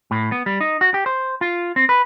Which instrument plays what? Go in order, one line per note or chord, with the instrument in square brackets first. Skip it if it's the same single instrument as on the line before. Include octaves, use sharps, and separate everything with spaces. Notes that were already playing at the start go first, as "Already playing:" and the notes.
[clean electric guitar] A2
B3
G3
D#4
F#4
G4
C5
F4
C4
B4